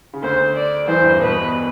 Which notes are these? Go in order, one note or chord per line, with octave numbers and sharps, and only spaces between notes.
C#3
D2 D3 C5
D5
E2 E3 C5
G2 G3
B2 B3 B4